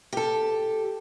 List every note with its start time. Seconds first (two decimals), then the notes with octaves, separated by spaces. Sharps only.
0.13 G4 A4